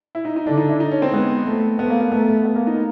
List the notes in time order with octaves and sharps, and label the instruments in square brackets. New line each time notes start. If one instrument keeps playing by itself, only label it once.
[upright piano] E4
D#4
D#4
[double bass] D3 [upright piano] D4
[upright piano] D#4
E4
D#4
C#4
C4
[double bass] G#3 [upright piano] B3
[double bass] A3
[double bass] A3 [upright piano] B3
[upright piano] A#3
A#3
[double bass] A3 [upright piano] B3
[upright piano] B3
A#3
D#4